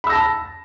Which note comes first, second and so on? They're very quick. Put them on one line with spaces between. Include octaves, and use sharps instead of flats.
B5 E6 A#6 A5